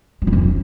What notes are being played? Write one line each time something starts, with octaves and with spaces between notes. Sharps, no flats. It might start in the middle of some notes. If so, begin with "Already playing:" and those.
F3
E3
F2